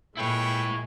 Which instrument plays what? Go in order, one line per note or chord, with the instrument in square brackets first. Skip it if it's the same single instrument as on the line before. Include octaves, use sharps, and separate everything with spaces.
[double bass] A#2 G#3 [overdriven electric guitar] E4 C#5 [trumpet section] A4 B4 G5